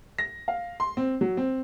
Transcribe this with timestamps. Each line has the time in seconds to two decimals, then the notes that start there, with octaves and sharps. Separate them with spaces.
0.18 A#6
0.48 F5
0.80 C6
0.97 C4
1.21 F#3
1.37 C4